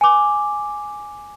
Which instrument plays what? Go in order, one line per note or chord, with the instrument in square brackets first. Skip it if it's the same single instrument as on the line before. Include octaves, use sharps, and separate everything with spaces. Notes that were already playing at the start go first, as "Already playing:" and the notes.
[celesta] G#5 D6